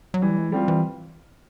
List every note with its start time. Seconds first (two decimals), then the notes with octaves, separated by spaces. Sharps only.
0.14 F#3
0.22 E3 G3
0.38 G#3
0.52 F3 G3 C4 F4
0.68 E3